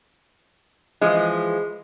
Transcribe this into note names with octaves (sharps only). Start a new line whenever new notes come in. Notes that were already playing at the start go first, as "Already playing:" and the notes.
E3 F3 G#3